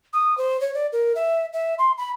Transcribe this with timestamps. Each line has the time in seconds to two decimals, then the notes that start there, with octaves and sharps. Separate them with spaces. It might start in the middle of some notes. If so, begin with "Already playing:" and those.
0.13 D#6
0.38 C5
0.61 C#5
0.74 D5
0.93 A#4
1.15 E5
1.53 E5
1.78 C6
1.98 B5